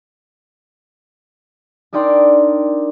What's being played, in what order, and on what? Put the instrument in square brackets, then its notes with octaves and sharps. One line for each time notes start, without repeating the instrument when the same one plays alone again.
[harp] D4 D#4 A#4 D5 G5 C6